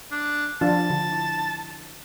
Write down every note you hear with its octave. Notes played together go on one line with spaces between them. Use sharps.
D4
F3 D4 F4 A5
D3
E4